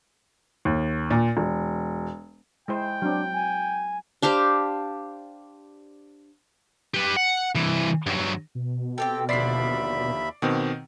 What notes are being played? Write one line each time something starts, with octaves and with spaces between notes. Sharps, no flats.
D#2
A#2
E1
G#3 E4 C5 G5
F#3 C4 D4
G#5
D4 G4 C5 F5
G4 B4
F#5
C2 E3
G2 F#3
B2
C4 G4 A4 G5
D#2 D3 F3 D5 E5 B5 B6 C7
B2 D#3 C4 G4